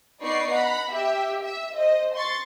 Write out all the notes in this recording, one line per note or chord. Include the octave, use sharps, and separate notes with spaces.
B3 D#4 D5 B5 C#6 C7
F#5 A#5 B5
G4 E5
E5
C5 D#5
C6 C#6 A6